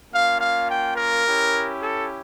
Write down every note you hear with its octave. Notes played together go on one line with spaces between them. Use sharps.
A#3 C#4 F4 F5
F5
G5
A#4
C#4 E4 G4
A4